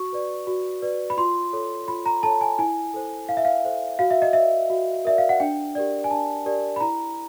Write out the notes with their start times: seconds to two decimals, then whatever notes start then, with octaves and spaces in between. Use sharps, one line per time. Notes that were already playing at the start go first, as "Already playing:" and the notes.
Already playing: F#4 C#6
0.13 B4 D5
0.47 F#4
0.82 B4 D5
1.10 B5
1.17 F4 C6
1.53 A4 C#5
1.88 F4 B5
2.06 A#5
2.23 A4 C#5 A5
2.41 G#5
2.59 E4 G#5
2.94 A4 C5
3.29 E4 F5
3.37 E5
3.45 F5
3.64 A4 C5
3.99 F#4 F5
4.10 E5
4.22 D#5
4.33 A#4 D5 E5
4.70 F#4
5.05 A#4 D5 E5
5.18 F5
5.29 F#5
5.40 D4 G5
5.75 G4 A#4 D5
6.04 G#5
6.11 D4 A5
6.46 G4 A#4 D5
6.76 B5
6.80 E4 A#5